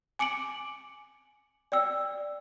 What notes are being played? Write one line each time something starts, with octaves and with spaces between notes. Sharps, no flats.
G#5 D6 C#7 D7 F#7
D5 G5 E6